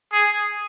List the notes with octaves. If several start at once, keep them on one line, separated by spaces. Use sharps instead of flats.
G#4